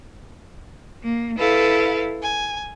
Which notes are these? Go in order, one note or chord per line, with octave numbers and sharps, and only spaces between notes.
A#3
E4 A4 B4 F5
G#5